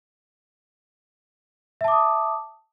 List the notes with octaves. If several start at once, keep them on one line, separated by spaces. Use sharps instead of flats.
E5 A5 D6 D#6